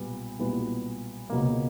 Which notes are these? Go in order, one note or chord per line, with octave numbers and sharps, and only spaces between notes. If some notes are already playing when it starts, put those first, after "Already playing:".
Already playing: B1 A#2 G3 B3
B1 A#2 G3 B3 E4
C#2 B2 F#3 A#3